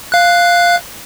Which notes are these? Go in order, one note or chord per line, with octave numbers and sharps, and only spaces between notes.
F5 F#6